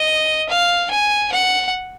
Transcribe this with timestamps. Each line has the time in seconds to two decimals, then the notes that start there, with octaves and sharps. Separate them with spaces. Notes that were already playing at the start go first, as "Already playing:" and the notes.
Already playing: D#5
0.49 F5
0.90 G#5
1.32 F#5